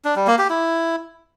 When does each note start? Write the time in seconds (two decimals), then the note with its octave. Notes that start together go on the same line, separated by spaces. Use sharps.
0.05 D4
0.16 G3
0.27 A#3
0.38 G4
0.50 E4